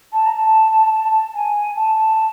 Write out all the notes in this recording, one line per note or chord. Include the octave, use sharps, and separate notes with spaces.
A5
A#5
A5
G#5
A5
A5